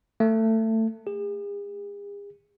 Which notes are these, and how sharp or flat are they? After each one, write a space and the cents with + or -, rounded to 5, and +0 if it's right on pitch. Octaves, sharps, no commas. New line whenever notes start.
A3 +20
G#4 -45